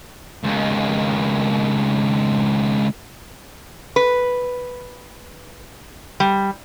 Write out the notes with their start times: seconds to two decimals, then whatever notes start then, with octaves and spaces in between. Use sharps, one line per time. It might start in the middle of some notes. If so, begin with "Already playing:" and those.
0.44 C#2 D#3
3.96 B4
6.20 G3